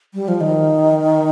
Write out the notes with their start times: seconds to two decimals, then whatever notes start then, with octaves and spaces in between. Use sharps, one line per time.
0.14 G3
0.28 F3
0.41 D#3